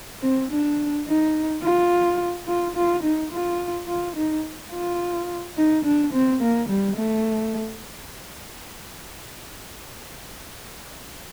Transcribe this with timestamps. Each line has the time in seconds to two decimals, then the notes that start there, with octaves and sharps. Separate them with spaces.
0.22 C4
0.51 D4
1.07 D#4
1.62 F4
2.47 F4
2.76 F4
3.03 D#4
3.32 F4
3.88 F4
4.16 D#4
4.72 F4
5.57 D#4
5.84 D4
6.13 C4
6.41 A#3
6.69 G3
6.97 A3